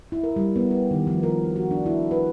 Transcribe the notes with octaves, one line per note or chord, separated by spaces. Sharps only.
E4
A#4
G3
B3
G4
D#3
F3
A#4
F#4
D4
E4
B4